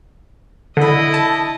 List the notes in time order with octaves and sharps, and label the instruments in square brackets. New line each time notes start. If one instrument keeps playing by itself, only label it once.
[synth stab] D3 B5 [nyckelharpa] E4 D#5
[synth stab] A5